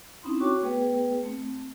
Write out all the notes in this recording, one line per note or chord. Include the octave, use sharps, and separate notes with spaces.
C4 C#4 D#4 E4 B5 C6
F#4 C#5 G5 C#6 D6
A3 B3 G#4 B4 G5
A3 C4